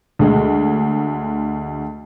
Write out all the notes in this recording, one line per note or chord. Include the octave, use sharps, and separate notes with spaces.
D2 G#3